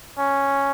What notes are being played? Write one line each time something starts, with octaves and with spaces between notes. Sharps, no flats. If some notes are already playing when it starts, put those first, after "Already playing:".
C#4